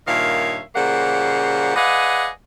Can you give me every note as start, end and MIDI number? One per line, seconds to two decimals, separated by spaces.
0.07 0.59 43
0.07 0.59 46
0.07 0.59 51
0.07 0.59 73
0.07 0.59 76
0.07 0.59 77
0.75 1.73 46
0.75 1.73 49
0.75 1.73 55
0.75 1.73 58
0.75 1.73 72
0.75 1.73 78
1.75 2.27 68
1.75 2.27 71
1.75 2.27 74
1.75 2.27 75
1.75 2.27 77
1.75 2.27 78